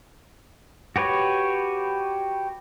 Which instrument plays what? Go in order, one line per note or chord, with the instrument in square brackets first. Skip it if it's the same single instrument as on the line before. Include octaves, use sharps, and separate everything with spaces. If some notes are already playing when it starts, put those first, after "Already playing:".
[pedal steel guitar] F#4 G4 B4 C#5